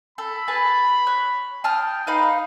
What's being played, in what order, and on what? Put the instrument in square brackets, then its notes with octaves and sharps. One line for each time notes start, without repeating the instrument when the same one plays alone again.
[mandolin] A4 [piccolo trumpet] B5
[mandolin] G#4 B4 A5
C#5 F#6
[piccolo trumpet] G5 [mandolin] A5 D#6 F6
[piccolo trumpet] D#4 [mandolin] B4 F5 B5